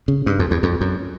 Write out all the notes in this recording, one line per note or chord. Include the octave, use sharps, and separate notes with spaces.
C#3
G2
F2
E2
F2
F#2